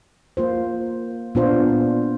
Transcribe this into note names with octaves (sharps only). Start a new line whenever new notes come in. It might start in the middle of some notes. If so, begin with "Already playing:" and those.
A#3 F4 C5
A#2 B3 D4 F4 C5